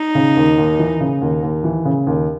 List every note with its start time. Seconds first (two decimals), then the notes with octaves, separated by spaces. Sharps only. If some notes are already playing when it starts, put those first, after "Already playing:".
Already playing: D#4
0.15 C#3
0.36 D#2
0.58 D#2
0.79 E3
1.00 C#3
1.22 D#2
1.43 D#2
1.64 E3
1.85 C#3
2.07 D#2